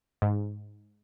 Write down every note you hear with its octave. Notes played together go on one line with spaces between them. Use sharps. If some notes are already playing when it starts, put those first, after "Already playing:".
G#2